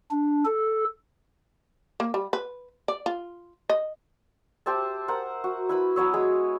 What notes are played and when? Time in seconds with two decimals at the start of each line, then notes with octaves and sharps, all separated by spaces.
0.11 D4
0.45 A4
2.00 A#3
2.14 G3
2.33 B4
2.88 D5
3.06 F4
3.70 D#5
4.66 G4 C5 E5 A5
5.08 A#4 C5 F#5
5.44 F#4
5.69 E4 B4 B5
5.96 F#3 B3 C#5 E6
6.14 G#3 G#4